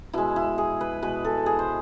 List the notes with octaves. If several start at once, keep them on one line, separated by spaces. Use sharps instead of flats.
B2 G#3 E4
E4
G#4
B4
B2 G#3 B4
A4
G#4
C5